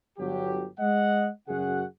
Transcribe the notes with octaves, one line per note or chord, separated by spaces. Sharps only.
G1 F#3 G4
G#3 D#5 F#5
F#2 C#3 F#4 G#4 F#5